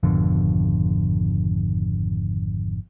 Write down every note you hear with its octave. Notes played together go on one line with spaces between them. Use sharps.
G#1 F2 B2 D3